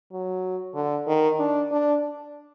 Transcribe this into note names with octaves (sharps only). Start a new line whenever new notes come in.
F#3
D3
D#3
D4
D4